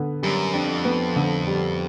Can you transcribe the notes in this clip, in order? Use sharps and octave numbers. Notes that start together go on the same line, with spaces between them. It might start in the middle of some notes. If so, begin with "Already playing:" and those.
Already playing: D3 B3
F#2 G3
F2 D4
B3
D3
G3